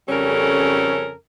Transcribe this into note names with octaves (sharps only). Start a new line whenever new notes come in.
F2 C#3 G3 C#4 A4 A#4